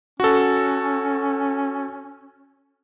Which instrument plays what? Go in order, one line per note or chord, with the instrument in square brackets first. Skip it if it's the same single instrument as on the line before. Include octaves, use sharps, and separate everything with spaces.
[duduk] C#4 [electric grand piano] F#4 A4